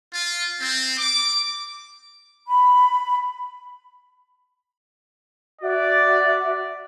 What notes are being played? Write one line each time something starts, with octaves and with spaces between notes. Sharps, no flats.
F4
C4
D6
B5
F#4 D5 E5